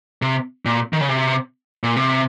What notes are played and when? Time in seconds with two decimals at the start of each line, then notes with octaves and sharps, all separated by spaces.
0.22 C3
0.65 A#2
0.93 D#3
1.01 C#3
1.09 C3
1.83 A#2
1.96 C3